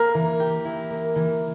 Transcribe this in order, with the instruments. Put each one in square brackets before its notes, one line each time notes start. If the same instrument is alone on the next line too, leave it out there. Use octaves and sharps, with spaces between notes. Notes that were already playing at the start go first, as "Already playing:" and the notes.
Already playing: [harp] A#3 [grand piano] A#4
[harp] E3
G4
E4
A#3
E3